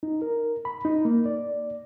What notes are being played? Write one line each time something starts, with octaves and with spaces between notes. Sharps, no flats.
D#4
A#4
B5
D#4
A#3
D5